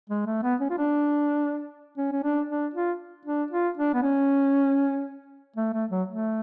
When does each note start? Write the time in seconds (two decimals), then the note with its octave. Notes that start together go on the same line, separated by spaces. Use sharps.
0.09 G#3
0.26 A3
0.43 B3
0.60 C#4
0.70 F4
0.78 D4
1.98 C#4
2.12 C#4
2.23 D4
2.49 D4
2.74 F4
3.25 D4
3.51 F4
3.77 D4
3.94 B3
4.02 C#4
5.56 A3
5.73 A3
5.91 F#3
6.08 A3